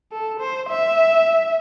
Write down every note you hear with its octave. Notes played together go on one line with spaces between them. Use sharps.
A4
C5
E5